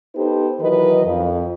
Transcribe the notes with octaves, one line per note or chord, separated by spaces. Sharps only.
B3 D#4 G4 A4 B4 C5
D#3 E3 F#3 A#4 B4 D#5
F2